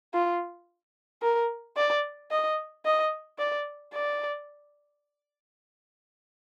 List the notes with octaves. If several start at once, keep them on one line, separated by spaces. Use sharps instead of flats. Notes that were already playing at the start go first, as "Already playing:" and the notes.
F4
A#4
D5
D#5
D#5
D5
D5